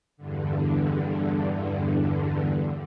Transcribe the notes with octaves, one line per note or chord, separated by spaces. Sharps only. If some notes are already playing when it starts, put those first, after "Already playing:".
E2 G2 D3